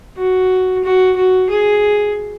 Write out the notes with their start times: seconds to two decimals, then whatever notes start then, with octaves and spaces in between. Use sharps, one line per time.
0.17 F#4
0.84 F#4
1.16 F#4
1.50 G#4